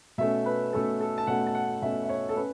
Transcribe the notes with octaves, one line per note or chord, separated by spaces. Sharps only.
B2 A3 C#4 E5
B4
B2 A3 C#4 A4
A4
A5
B2 A3 C#4 F#5
A5
F#5
B2 A3 C#4 E5
E5
C#5
A4
C#4 B4